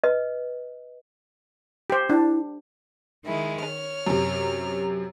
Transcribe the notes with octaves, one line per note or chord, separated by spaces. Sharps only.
B4 D#5
G4 C5
D4 E4
D#3 G#3 E4
C#5 F6
F#2 C3